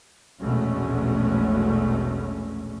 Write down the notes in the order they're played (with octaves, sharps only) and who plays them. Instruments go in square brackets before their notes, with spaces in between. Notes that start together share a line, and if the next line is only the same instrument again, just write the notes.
[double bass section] A#1 E2 B2 G#3 A3 C#4